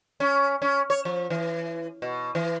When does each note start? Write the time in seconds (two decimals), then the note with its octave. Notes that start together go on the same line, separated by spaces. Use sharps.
0.20 C#4
0.62 C#4
0.90 C#5
1.05 F3
1.30 E3
2.02 B2
2.35 E3